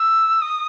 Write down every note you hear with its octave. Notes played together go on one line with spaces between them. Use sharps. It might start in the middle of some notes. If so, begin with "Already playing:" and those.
Already playing: E6
D#6